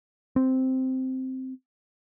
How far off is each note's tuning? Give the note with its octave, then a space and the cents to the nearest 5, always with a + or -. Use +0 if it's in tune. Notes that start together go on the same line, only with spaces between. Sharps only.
C4 -5